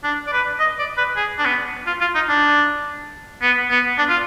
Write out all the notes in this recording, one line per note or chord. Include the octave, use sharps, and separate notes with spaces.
D4
D5
B4
D#5
D5
B4
G#4
D4
B3
F4
F4
D#4
D4
B3
B3
D4
F4